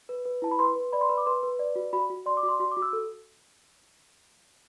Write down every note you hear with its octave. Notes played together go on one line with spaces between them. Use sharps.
B4
B4
E4 A5
B5
B4 C6
B4
D5 B5
C6
B4 B5
D6
B4 C6
B4
D5
F#4
F#4 B5
F#4
D5 C6
D6
F#4
C6
F#4 C6
D6
F#4
E6
A4